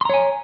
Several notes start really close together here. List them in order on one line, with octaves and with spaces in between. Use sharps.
C6 A#5 C#5 G#5